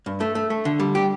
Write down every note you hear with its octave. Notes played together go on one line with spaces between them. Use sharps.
G2
A3
A3
A3
D3
G3
G4